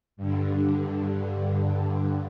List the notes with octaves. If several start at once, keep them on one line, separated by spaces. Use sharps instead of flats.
G2 D3